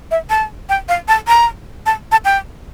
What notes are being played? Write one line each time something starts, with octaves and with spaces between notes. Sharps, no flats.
E5
A5
G5
F5
A5
A#5
A5
A5
G5